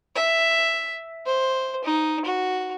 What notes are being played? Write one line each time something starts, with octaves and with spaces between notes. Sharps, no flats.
E5
C5
D#4
F#4